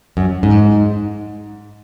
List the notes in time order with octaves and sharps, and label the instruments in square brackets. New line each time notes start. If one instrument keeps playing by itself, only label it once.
[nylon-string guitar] F#2
G#2